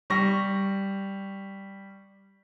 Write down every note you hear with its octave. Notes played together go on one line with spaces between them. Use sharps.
G3 C#6 A#6